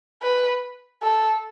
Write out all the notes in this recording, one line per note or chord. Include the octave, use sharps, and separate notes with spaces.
B4
A4